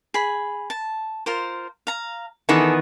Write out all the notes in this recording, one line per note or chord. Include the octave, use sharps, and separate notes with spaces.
G#4 B5
A5
F4 A#4 C5
F5 A#5
D#3 E3 B3 G#4 A4 A5